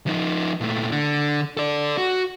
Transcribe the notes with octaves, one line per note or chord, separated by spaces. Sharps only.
F3 D#4
A#2 A3
D3
A4 D5
F#4